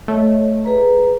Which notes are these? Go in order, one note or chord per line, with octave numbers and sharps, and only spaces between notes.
A3 C#5 D#5
G#4 B4 A#5